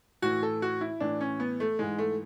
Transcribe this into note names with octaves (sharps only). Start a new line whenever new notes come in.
A2 E3 F#4
A4
F#4
E4
A2 E3 D4
C#4
B3
A3
G#2 E3 G#3
A3